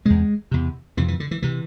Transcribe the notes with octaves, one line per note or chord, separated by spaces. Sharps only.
E2 C3 G#3
E2 C3
F2 C3 E3
E3
D3
E3
C3 E3